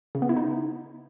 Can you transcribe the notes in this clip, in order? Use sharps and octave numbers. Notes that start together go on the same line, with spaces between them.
C#3
B3
E4
D#4